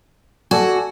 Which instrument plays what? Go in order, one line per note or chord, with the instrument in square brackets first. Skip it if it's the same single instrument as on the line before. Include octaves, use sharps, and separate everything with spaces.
[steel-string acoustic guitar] F#4 [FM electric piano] A4 D5 G#5